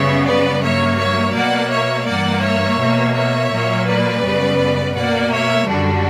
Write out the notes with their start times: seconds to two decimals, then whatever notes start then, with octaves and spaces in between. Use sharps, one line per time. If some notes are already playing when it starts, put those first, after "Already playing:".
Already playing: F#2 C#3 G3 B3 C#5 E5
0.26 B4 D5
0.62 G2 F#3 A#3 C#5 E5
0.98 C#5 E5
1.34 B2 A#3 D5 F#5
1.70 C#5 E5
2.06 G2 E3 A#3 D5 F#5
2.43 C#5 E5
2.79 B2 A#3
3.15 C#5 E5
3.51 A#2 F#3 A#3
3.87 B4 D5
4.23 F#2 C#3 G3 B3
4.95 B2 A#3 D5 F#5
5.32 C#5 E5
5.67 F#2 D3 G3 D4 F#4